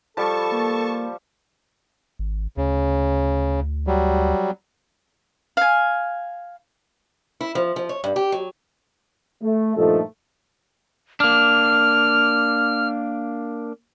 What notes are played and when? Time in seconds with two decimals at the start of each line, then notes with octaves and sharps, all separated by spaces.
0.17 F3 G3 A4 A5 C#6
0.52 A#3
2.19 G#1
2.57 D2 C#3
3.87 F#3 G3
5.57 F5 G#5
7.41 E4
7.55 F3
7.76 F3
7.89 C#5
8.04 G2
8.16 G4
8.32 F#3
9.42 A3
9.76 G2 A#2 F3 A3 D#4 A4
11.20 A#3 D4 F6